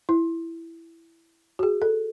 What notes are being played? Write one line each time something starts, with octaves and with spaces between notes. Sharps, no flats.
E4
F#4
G#4
A4